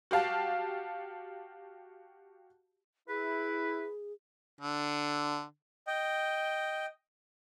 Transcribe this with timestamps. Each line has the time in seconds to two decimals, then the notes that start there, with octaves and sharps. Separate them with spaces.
0.11 F#4 G4 F5 A5
3.09 E4 G#4 B4
4.61 D3
5.87 D#5 G5